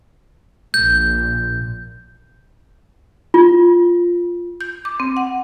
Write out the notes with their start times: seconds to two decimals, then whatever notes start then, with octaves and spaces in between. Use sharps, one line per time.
0.74 A#1 A#2 G6
3.34 F4
4.61 G6
4.85 D6
5.00 C4
5.17 F#5